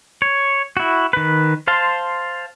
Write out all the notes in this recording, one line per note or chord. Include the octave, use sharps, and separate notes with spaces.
C#5
E4 F#4
D#3 B4
C5 F5 A5 C6